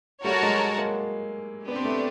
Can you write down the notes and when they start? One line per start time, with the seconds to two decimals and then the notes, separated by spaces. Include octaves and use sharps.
0.24 G3 A3 F#4 A#4 C#5 F#5 A5
0.42 F#3 G#3
0.78 G#3 A#3
1.67 B3 D4 G4 B4
1.76 C4
1.85 A3 B3